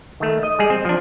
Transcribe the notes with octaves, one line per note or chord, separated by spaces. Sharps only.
D#3 A3
D#5
G3 G#3 G#4
C4
F3 D4